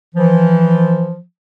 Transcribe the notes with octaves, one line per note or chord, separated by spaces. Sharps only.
E3 F3